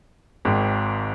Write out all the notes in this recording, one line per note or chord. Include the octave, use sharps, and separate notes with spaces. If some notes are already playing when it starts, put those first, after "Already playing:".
G#1 G#2 D#3